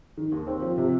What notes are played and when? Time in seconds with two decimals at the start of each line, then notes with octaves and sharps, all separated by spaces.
0.17 D#3
0.32 D#2
0.47 C4
0.62 F3
0.78 C3